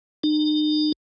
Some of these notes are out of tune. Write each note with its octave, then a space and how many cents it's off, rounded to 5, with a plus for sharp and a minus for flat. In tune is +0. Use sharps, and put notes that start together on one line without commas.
D#4 -40